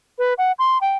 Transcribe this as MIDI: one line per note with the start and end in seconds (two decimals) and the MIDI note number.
0.18 0.34 71
0.38 0.52 78
0.59 0.78 84
0.81 0.97 79